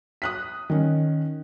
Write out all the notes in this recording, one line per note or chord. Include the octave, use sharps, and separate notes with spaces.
D#6 F#6 B6
D#3 C#4